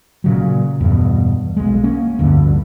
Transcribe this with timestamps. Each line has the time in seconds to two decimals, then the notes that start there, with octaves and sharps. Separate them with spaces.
0.24 A#2 C#3 F#3
0.80 E2 G2 B2
1.57 B1 G#3
1.84 A#3 C#4
2.19 F1 D2 G2 D3